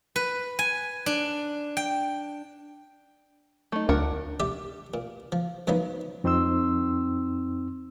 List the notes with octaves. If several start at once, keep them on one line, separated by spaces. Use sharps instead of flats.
B4
G#5
D4
G5
A3 D#4
D2 D4 A#4 F#5
G4 D5 E5
A#2
F3
F#2 F3 F#3 B3 D#4
F2 C4 D#4 C6 E6